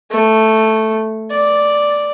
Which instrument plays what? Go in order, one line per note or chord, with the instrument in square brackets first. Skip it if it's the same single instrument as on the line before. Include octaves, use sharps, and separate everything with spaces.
[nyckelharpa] A3
D5